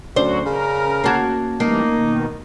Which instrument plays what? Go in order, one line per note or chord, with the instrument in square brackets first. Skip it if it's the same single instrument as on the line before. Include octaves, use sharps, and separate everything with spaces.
[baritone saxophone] D2 [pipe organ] F#3 F#4 [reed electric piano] C#4 D5 [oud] C5
[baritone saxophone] C#3 [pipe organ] A#4
[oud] A#3 F#4 [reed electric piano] C#4 A5 G#6
[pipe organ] E3 G3 [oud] A#3 [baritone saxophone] D#4
[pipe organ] B2 D#3